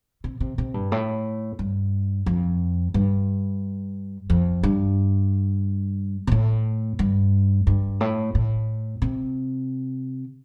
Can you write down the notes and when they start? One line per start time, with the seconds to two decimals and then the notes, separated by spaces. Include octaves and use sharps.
0.24 C3
0.40 C3
0.58 C3
0.74 G2
0.92 A2
1.59 G2
2.26 F2
2.94 G2
4.30 F2
4.63 G2
6.27 C3
6.32 A2
6.99 G2
7.67 G2
8.01 A2
8.35 A2
9.02 C3